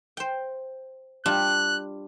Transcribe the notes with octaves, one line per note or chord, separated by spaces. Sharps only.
C5 G5
G3 D4 F4 F#6